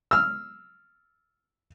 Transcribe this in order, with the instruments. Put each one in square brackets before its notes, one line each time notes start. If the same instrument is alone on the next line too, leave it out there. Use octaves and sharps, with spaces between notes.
[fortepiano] E6 F6